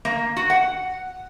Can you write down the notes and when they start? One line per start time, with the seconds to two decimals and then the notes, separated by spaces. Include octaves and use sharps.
0.05 A#3
0.36 F#4
0.50 F#5